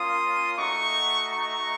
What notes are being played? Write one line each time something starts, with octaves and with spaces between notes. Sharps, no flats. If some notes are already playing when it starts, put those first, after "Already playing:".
Already playing: A#3 C#4 F4 C6 D#6
A3 D#4 F#4 A#5 C#6
A#5 C#6